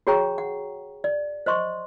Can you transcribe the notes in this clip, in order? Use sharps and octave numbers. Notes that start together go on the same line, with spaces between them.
F#4 G#4 C#5 G5 A#5 C#6
F#5
D5
C5 D#5 C6 C#6